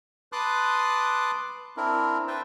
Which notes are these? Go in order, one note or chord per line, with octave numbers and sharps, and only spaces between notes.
B4 A5 C6 D6 D#6 F#6
C4 D4 E4 A#4
B4 C5 E5 G5 A5